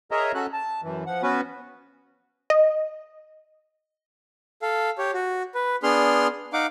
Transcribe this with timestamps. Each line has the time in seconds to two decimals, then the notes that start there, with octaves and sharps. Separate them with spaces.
0.11 G#4 A#4 C#5 D#5 E5 A#5
0.34 C#4 F#4 A4 F#6
0.53 A5
0.83 F#2 E3
1.07 F3 F#5
1.22 B3 C#4 F#4 B4
2.50 D#5
4.62 A4 F5
4.98 G4 C#5
5.14 F#4
5.55 B4
5.83 B3 D4 G#4 C6 F6
6.53 D#4 F5 F#5 D6